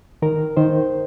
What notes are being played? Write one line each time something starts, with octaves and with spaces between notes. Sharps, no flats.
D#3 A#4
D#3 C5